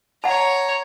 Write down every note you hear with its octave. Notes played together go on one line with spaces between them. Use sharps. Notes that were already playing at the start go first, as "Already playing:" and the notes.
C#5 F#5 A5 A#5